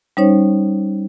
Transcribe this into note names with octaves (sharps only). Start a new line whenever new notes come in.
G3 C#4 D#4 C5 C#5